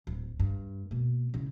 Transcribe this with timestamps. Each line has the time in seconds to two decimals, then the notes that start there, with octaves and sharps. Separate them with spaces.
0.07 D1
0.40 G2
0.91 B2 A#3
1.34 C#3 E4